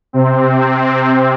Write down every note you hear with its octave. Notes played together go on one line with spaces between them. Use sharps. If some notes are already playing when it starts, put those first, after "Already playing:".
C3 C4